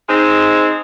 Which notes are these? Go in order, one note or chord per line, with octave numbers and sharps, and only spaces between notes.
G#3 C4 D#4